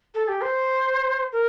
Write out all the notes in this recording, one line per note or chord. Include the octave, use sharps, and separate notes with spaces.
A4
G4
C5
A#4